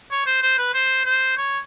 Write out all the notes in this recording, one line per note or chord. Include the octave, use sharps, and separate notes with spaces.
C#5
C5
C5
B4
C5
C5
C#5